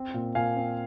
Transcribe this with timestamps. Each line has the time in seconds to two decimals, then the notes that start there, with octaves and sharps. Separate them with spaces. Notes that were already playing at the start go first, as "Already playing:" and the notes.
Already playing: C4
0.14 A#2
0.35 A#2 F5 G#5
0.56 C4